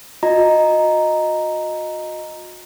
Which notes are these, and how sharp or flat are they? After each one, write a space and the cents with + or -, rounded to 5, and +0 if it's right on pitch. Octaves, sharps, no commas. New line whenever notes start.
F#4 -45 D#5 +0 A#5 +0